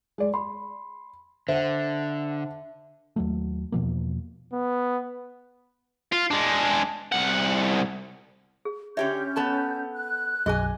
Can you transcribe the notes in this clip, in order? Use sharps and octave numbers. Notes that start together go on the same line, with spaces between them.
G#3 D5
B5 C6
D3 C5 E5 F#5
D#2 F#3 A3
E2 B2 F3 A#3
B3
F4
G#3 D4
C2 F#5
G#4
D3 C#4 G4 G#4 C#5 E5 G6
B3 A4 A5
F#6
B1 F#2 F#4 G#4 D#5 G#5 D6